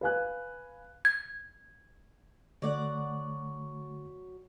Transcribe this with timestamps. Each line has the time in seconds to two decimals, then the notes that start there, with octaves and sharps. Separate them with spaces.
0.01 B4 F5 G#5 F#6
1.05 G#6
2.62 D3 F#3 A3 D5 F#5